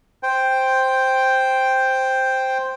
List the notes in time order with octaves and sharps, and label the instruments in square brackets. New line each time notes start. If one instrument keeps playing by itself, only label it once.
[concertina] C5 G5